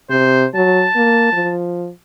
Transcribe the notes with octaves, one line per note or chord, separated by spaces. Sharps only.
C3 C5
F#3 A5
A#3
F3